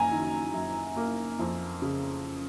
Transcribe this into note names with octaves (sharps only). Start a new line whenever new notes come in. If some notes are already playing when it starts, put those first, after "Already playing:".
Already playing: F#2 G#5 A#5
D#3
F#2
A#3
F2
C#3